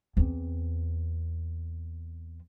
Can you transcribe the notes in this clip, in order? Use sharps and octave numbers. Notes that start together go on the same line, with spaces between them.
E2 C4